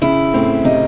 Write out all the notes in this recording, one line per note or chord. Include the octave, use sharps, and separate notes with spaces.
C#3 E4
A2 C4
C3 D#4